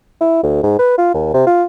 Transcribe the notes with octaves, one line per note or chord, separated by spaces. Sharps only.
E4
D2
G#2
B4
F4
D#2
C3
F4